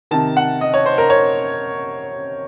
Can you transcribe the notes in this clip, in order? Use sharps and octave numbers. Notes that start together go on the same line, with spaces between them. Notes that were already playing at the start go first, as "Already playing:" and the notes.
C3 D#3 A5
F#5
D#5
C#5
C5
A#4
C#5